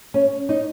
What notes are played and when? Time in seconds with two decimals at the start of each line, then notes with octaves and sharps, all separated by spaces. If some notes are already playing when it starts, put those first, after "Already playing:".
0.14 C#4
0.49 D#4